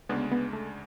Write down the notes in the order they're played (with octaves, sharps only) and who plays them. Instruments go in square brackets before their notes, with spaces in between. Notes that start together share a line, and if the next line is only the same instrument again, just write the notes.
[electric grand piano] D2 C#3 G#3 D4 [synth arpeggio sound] B3
[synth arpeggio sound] B3
A3